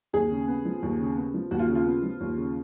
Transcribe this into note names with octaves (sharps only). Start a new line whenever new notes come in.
D#2 G#4
C#3
B3
F3
D#2
C#3
B3
F3
D#2 F#4
F4
C#3
F4
B3
F3
D#2
C#3